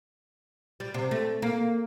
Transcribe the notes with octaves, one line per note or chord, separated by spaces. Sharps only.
G3
C3
A3
A#3